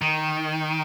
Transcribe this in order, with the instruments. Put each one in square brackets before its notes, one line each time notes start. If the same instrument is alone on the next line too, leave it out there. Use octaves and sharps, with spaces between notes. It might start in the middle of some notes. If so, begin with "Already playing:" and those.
[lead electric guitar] D#3